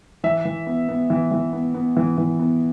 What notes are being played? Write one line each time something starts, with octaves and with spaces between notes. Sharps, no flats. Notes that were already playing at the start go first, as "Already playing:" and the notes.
E3 E5
E3
B3
B3
E3
E3
B3
B3
E3
E3
B3